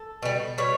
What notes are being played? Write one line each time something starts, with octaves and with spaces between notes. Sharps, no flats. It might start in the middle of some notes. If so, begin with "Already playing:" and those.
Already playing: A4
B2 G3
B2 G3 C#5